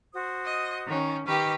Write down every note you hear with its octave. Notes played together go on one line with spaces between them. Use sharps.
F#4 C5 D#6
D#5
D#3 C#4
D#3 G4 B4 D#5 C#6 F6